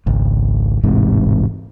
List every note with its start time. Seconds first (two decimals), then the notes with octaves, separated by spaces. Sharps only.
0.06 G#1 C#2
0.83 E1 A1 G#2 C3